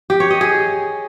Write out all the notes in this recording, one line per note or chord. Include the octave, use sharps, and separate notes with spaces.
G4
C#5
D#5
G#4